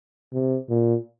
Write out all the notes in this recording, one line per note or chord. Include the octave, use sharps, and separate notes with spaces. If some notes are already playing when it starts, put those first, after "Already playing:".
C3
A#2